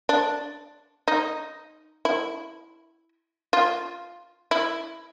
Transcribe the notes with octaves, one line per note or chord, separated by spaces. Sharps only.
D4
D#4
E4
F4
E4